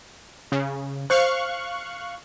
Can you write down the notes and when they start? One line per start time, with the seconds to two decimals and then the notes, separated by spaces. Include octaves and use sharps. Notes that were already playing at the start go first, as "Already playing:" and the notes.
0.52 C#3
1.10 C5 F5 C#6 F#6